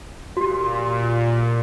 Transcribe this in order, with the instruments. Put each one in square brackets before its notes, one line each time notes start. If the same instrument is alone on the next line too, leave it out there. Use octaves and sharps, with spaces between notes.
[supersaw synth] A#2 [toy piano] F#4 G4